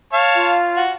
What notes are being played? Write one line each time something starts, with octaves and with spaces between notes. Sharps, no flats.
C#5 F5 A5
F4
F#4